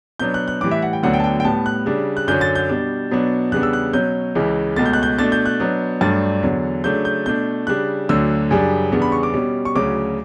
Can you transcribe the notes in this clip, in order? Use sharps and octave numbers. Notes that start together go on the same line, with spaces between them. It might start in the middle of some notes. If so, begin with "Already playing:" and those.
B2 F#3 B3 D4 G6
F#6
F#6
A2 E3 G3 D6
E5
F#5
G5
D2 D3 F#3 B3 F#5
G5
A5
G5
G5
A2 G3 B3 A5
F#6
C#3 G3 D4
F#6
F#2 D3 F#3 C#4 G6
A6
G6
B2 G3 D4
B2 F#3 B3 D4
E2 C#3 G3 B3 D4 F#6
E6
F#6
B2 F#3 C#4 G6
C#2 C#3 E3
C#2 B2 A3 A6
G6
F#6
G6
B2 A3 D4 A6
G6
F#6
B2 F#3 B3 D4
G2 F#3 A3 D4 A6
E2 D3 F#3
C#3 F#3 A3 D4 G6
G6
B2 A3 D4 G6
C#3 G3 D4 F#6
D2 D3 F#3 E6
F#2 C#3 G3 D4
E2 C#3 G3 B3 D4
B5
C#6
D6
B2 G3 C#4
C#6
D2 C#3 F#3 C#4 D6